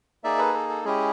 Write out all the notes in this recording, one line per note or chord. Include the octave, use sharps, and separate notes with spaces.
A#3 D#4 G#4 D5 E5
A4 B4
A4
A4
G#3 C#4 E4 G4 G#4